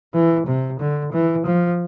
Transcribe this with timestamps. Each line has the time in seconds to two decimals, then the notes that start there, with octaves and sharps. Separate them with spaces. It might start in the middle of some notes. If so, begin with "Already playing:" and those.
0.14 E3
0.46 C3
0.79 D3
1.12 E3
1.46 F3